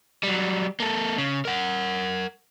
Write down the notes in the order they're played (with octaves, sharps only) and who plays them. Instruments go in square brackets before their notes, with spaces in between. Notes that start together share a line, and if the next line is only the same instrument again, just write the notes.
[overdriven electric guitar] F#3 G3
A#3 A4
C#3
A#4 F#5